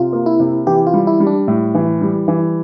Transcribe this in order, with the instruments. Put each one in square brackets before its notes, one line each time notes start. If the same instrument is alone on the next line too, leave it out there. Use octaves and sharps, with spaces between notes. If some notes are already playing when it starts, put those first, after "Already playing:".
Already playing: [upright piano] C3 [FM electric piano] F4
[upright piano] A#3
[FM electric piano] E4
[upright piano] C3
[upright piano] E3 [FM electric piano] G4
[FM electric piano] F4
[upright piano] G3
[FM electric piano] E4
[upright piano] G3
[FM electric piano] D4
[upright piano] A2
E3
G3
E3